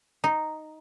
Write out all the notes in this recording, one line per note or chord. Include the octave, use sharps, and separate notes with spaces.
D#4